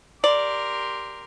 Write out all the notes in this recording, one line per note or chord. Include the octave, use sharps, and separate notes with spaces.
G4 A#4 D5 C6